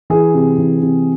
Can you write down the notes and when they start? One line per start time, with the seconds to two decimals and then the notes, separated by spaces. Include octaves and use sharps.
0.10 E3 G#4
0.34 C3
0.58 E3
0.82 C3